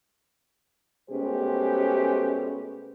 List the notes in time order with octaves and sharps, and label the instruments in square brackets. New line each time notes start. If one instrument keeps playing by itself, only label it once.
[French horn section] B2 G#3 A3 C#4 G4 C5